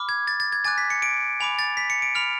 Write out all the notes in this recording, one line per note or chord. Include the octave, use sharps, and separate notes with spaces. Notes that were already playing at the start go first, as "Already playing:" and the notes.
Already playing: B5 D6 F6
G#6
A6
A6
G#6
G#5 D6 F#6 A6
B6
C#7
D7
G#5 B5 D6 F7
A6
B6
C#7
D7
B5 F6 F7